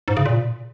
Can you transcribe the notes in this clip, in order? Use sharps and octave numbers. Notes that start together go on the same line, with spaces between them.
G#2
C#3
A#2